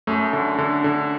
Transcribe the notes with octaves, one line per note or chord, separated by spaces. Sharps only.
F#2 A3
D3
D3
D3